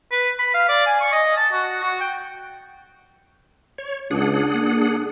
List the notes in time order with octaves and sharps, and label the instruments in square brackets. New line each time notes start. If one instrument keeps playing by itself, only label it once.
[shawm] B4
B5
F5
D5
G#5
C#6
D#5
A5
F#4
F#4
G5
[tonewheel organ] C#5
[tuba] C#2 [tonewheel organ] D4 G#4 F#5
[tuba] A#3